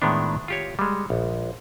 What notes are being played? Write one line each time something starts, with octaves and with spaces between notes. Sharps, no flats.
A2 D#3 G#3 B3 D4
F4 G4 C#5
G3 G#3
A#1